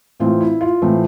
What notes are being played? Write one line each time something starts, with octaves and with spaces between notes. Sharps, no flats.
A2 E3 A3 C4 F4
E4
F4
A2 E3 A3 C4